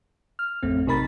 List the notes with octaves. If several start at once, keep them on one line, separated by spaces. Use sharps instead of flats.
F6
A1 F2 A3 C4
B1 C3 D#4 A#4 B5 A6